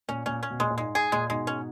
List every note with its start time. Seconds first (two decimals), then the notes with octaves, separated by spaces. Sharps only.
0.08 A#2 C#4
0.26 A#2 C#4
0.43 C#4
0.50 B2
0.60 A#2 G#3
0.70 A#2
0.78 G#2 G#3
0.95 G#2 G#4
1.12 A#2 G#3
1.29 G#2 B2 G#3
1.47 C#4